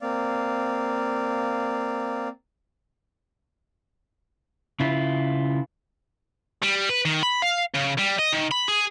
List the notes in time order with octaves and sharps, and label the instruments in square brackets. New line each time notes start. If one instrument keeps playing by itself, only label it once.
[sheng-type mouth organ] A#3 C4 D5 F5
[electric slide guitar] C#3 E4 F4
[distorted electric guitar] G3
B4
D#3
B5
F5
C#3
G3
D#5
D#3
B5
G#4